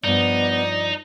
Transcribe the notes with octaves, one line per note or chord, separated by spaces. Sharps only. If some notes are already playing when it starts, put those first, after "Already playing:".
G2 F3 B3 D#4 D5